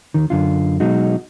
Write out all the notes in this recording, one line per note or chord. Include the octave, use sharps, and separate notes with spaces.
D#2 D#3
F#2 D3 F4
B2 F#3 G#3 D#4 F#4